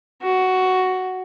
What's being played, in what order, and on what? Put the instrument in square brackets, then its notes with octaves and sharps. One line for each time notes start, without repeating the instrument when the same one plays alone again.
[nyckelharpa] F#4